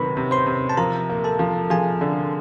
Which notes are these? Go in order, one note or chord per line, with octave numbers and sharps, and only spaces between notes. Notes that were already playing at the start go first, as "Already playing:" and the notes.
Already playing: C3 D#3 F#3 B4 B5
C3
C5 C6
C3
A5
F3 A#4 A#5
A#3
A4 A5
F3
F3 G#4 G#5
D3